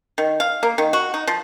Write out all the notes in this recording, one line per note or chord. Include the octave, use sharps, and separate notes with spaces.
D#3
F5
A#3
D#3
F#4
D#4
F3